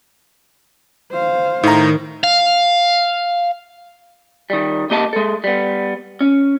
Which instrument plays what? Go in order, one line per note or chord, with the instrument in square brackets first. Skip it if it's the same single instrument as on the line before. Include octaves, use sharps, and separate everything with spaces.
[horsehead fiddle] C5 F5
[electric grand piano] A2 A#5 [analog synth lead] D#3
[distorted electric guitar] F5
[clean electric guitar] D#3 G3
C#2 A#3 G4 D#5 G5 A5
G#3 A4
G3 B3
C#4